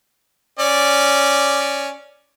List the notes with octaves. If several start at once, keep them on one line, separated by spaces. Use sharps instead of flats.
C#4 D5